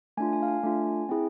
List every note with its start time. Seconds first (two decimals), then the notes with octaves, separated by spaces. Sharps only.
0.17 A3 D4 F4 G#5
0.33 G#5
0.43 F5
0.48 G#5
0.63 A3 D4 F4
1.09 C4 E4 G#4